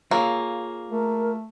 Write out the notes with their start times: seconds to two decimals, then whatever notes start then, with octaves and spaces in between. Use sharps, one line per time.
0.11 A#3 F4 G#4 C#5
0.91 A3 A#4